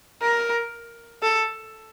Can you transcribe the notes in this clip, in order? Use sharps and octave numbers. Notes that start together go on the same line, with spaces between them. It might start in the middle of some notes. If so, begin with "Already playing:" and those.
A#4
A4